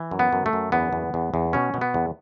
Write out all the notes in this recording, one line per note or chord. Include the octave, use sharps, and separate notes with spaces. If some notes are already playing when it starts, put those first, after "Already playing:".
Already playing: E3
F#2
B3
F#2
A3
F#2
E2 B3
E2
E2
E2
B2 C#4
B2
B3
E2